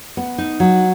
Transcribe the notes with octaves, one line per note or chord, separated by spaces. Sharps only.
B3
D#4
F#3